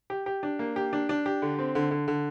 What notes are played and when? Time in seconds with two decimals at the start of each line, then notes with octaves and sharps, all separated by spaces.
0.10 G4
0.26 G4
0.43 D4
0.59 A#3
0.76 G4
0.93 D4
1.09 D4
1.26 G4
1.42 D3
1.59 C4
1.75 D3
1.91 D3
2.08 D3